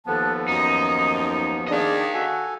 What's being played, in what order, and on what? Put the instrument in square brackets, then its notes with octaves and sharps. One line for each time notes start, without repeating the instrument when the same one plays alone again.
[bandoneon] D#2 F3 B3 [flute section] A4 A5 F#6
[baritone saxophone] F#2 [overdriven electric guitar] D#4 [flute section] D#6
[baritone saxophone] D#3 [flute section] D4 G#4 D5 [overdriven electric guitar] D#5 F5
[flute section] F#4 [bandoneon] A4 G#5